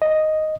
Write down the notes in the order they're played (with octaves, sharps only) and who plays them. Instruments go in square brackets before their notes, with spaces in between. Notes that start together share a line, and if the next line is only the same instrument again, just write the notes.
[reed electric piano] D#5